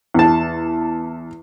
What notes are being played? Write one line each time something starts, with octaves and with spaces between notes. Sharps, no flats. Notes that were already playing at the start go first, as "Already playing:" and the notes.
E2 A5